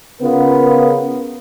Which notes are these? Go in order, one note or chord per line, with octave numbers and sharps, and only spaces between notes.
C#3 B3 F4 A#4